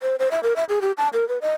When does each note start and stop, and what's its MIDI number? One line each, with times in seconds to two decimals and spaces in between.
0.02 0.16 72
0.19 0.28 72
0.31 0.40 76
0.43 0.53 70
0.56 0.64 76
0.69 0.79 68
0.81 0.92 67
0.97 1.08 81
1.13 1.27 70
1.28 1.38 71
1.41 1.53 75